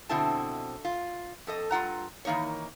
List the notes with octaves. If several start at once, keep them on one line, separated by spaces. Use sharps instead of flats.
F2 B2 D3 C4 E4 A5
F4
F2 A4 D#5
G2 F4 F#5 A#5
D#3 E3 A#3 D#4 C#5